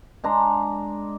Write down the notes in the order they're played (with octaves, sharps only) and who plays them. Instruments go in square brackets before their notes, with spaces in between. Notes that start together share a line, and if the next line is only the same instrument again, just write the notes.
[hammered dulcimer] G#3 D4 A#5 C6